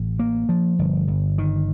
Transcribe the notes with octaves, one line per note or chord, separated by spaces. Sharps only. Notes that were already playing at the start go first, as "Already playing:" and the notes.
Already playing: A1
A#3
F3
G1
G1
D#3